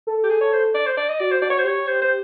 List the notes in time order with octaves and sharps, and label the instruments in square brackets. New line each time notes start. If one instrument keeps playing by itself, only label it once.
[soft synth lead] A4
[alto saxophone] G4
G#4
C#5
C5
D5
C5
D5
D#5
[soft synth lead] F#4 [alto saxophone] D5
[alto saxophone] C5
[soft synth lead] F#4 [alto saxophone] D5
[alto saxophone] C#5
[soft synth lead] F#4 [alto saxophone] C5
[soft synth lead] G4 [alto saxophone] C#5
[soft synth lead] G4 [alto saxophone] C5
[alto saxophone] C5